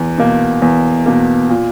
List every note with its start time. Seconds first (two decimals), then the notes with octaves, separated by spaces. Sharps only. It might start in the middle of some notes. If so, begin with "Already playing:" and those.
Already playing: E2
0.18 B2 A#3
0.62 E2
1.06 B2 A#3
1.49 A#2